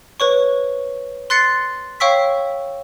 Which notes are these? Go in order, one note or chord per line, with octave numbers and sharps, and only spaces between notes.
B4 C#5 C#6
C6 F#6 A6 C7 C#7
C#5 F5 G5 C#6 E6 B6